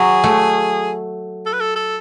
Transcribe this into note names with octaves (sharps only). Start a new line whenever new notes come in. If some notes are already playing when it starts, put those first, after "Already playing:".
Already playing: F#3 G#4
A3
A4
B4
A4
A4